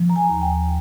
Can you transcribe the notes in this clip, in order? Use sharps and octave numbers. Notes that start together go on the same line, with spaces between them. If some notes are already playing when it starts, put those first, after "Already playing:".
Already playing: F3
A#5
G#5
D#2
G5